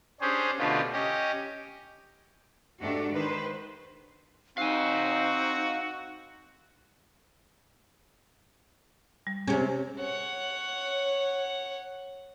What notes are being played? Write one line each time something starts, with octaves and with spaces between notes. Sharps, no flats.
C#4 D4 G4 G#4 C5
B2 D3 A3 F4 G4
C#4 G4 D#5
G#2 A3 D4 F#4 G4
D#3 B4 C5
C4 D#4 F#4 F5 G#5
G3
C3 C#4 G4 G#4 C#5
C#5 F#5